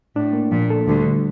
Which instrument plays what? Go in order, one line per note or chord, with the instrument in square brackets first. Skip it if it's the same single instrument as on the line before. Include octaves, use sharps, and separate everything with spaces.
[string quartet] A2 [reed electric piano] D4
[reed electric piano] A#3
[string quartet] A#2 [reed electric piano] F3
[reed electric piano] A4
[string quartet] D2 D3 [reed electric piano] G3
[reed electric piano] D3